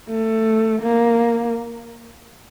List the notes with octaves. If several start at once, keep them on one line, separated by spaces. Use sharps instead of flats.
A3
A#3